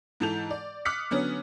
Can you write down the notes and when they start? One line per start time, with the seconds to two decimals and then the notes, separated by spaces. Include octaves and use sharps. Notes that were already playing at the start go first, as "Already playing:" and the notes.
0.20 G#2 E3 A4 A5 G6 F7
0.51 D5
0.85 D6 D#6 F6 F#6 B6 C#7
1.11 D3 F#3 B3 C#4